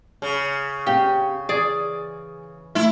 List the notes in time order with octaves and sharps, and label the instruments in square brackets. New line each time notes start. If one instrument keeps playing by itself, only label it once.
[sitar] C#3
[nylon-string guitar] C#4 C#5 F5 [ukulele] G4
[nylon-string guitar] E3 [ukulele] G#4 D5
[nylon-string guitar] A3 [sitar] E4